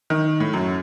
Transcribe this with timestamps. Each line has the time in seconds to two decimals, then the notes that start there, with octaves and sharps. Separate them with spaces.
0.10 D#3
0.40 A2
0.53 F#2